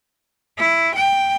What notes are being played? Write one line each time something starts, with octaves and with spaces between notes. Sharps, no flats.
E4
G5